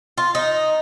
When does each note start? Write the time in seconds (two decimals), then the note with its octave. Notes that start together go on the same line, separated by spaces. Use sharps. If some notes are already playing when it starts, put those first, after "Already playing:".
0.18 F4
0.35 D#4